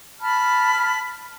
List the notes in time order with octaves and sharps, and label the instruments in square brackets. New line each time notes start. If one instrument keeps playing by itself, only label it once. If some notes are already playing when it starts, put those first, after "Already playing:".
[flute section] A5 B5 F6